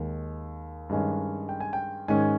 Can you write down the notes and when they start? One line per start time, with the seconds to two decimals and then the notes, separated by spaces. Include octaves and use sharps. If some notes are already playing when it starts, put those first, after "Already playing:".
Already playing: D#2 D#3 G#3
0.89 G2 D#3 G#3 C#4
1.49 G5
1.60 G#5
1.73 G5
2.08 G#2 D#3 G#3 C#4 G#5